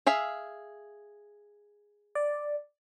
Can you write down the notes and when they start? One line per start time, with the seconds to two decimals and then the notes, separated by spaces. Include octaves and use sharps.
0.07 G#4 E5 F5
2.15 D5